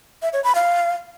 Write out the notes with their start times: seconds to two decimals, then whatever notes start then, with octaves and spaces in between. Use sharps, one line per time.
0.22 E5
0.33 C#5
0.44 B5
0.55 F5